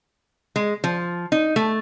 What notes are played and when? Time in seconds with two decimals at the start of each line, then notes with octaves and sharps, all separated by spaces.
0.56 G#3
0.84 F3
1.32 D#4
1.56 A3